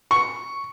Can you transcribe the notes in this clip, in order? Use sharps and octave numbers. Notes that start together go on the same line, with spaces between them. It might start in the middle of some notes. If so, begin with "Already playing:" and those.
C#6